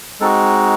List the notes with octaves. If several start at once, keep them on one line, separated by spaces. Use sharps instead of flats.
G#3 C4 D#4 F#4 A4